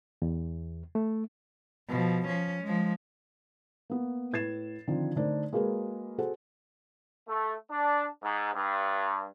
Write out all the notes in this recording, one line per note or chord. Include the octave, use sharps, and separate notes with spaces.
E2
A3
B2 F3
F3 C#4
F3 G#3
A#3 B3
A2 B4 G#6 A6 C7 E7
D3 D#3 F3 C4
D3 A3 D4 D#4 A#4 C5
G#3 A#3 F#4 G#4 A#4 B4
F#4 G#4 A4 C5 F#5
A3
D4
G#2
G2